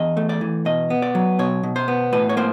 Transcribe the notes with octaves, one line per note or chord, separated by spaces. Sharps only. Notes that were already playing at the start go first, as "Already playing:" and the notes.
Already playing: E2 D#5
A3
D5
E3
B2 D#5
B3
D5
F#3
B2 C#5
B2
C5
B3
A2 B4
C#5
A#3 C5